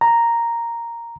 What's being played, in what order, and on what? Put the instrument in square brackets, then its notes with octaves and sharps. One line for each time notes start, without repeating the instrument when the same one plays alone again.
[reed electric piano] A#5